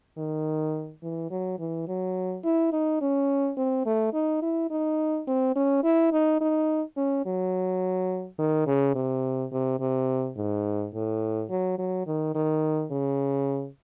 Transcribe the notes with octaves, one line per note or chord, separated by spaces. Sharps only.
D#3
E3
F#3
E3
F#3
E4
D#4
C#4
C4
A3
D#4
E4
D#4
C4
C#4
E4
D#4
D#4
C#4
F#3
D#3
C#3
C3
C3
C3
G#2
A2
F#3
F#3
D#3
D#3
C#3